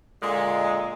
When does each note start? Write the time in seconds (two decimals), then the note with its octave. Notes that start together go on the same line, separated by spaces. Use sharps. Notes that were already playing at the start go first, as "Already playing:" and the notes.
0.22 A#2 D3 G#3